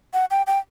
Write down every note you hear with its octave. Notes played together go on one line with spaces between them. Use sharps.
F#5
G5
G5